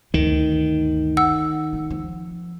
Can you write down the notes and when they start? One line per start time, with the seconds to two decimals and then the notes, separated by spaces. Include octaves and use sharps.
0.14 G1 D2 D#3
1.17 F#5 E6
1.73 D#4
1.91 F3